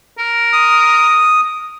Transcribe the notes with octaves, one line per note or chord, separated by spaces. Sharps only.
A#4
D#6